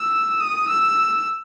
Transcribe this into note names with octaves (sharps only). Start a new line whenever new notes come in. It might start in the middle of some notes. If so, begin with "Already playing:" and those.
Already playing: E6
D#6
E6